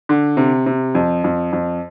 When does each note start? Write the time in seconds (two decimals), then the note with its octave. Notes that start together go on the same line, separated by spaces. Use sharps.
0.09 D3
0.37 C3
0.66 C3
0.95 F2
1.24 F2
1.53 F2